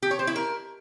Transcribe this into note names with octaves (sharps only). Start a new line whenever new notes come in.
G4
C#5
C5
E4
A#4